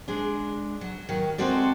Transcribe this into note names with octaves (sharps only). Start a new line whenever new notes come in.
G#3 D4
F#3
D#3 F#3
G#3 C4 F#4 A4 D5